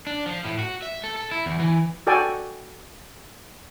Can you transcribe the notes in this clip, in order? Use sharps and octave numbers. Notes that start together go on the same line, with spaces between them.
D4
F3
A2
F#4
E5
A4
A4
E4
E2
E3
F#4 A4 D5 G5 G#5